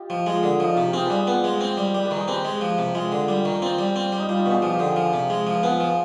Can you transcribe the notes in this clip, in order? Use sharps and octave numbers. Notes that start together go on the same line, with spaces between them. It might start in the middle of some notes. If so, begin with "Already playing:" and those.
Already playing: F4 G4 D#5
F3
G#3 F4 G#4
D3
F3 D#4
C3 F4
G4
C4 F4 G#4
G3 B4
G#4 C5
B3
G#3
C4
G3
G3 B4 D5
B4 D5
D#3
G#4 C5
C4 G4 B4
G#3
F3
C3
B4
G#3 F4 G#4
D3
G3
D#3
C4 F4
G3
C4
G3
D#4
G3 F4
D#4 G4
B2
F4 G#4
F3
G4 B4
D3
F4 G#4
F3
C3
G#3
F3
B4
B3 F4 G#4
F3